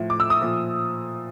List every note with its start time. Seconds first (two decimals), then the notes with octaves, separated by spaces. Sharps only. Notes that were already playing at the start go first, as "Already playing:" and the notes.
Already playing: A2 F3
0.10 D6
0.20 E6
0.30 D#6
0.41 A#2 F3